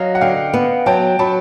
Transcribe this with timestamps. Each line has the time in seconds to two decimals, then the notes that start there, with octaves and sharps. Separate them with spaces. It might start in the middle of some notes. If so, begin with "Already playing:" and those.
Already playing: F#3 D#5 F5
0.15 F#5
0.21 D3 F5 G5
0.54 B3
0.86 F#3 G5 A5
1.19 F#3 A5 B5